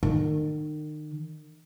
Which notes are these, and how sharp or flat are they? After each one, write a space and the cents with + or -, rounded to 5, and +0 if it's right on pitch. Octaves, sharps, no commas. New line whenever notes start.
D#3 -35